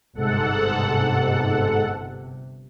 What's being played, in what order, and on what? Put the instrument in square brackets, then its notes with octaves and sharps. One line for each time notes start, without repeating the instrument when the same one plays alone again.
[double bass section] G1 C3 [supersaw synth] G#2 A4 F#5